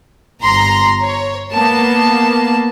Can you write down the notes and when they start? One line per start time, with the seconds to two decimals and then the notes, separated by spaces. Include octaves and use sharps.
0.42 G1 A#5 C6
1.02 C#5
1.53 A#3 B3 A5